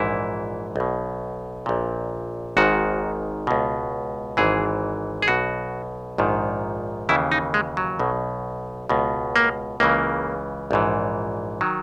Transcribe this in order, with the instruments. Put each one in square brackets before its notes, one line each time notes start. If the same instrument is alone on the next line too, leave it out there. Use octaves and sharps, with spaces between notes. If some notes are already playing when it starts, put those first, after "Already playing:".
Already playing: [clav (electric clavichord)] A#1 G#2 E3 E4
B1 B2
A#1 A#2
G#1 G#2 D#3 F#4
C#2 B2
G#1 G#2 E3 G#4
G#4
B1 B2 F#4
A#1 G#2 D#3
D#2 C#3 E3 E4
D#4
G#3
F#3
B1 B2
C#2 B2
A#3
C#2 C#3 E3 A#3
A#1 G#2 E3
D#3 F#3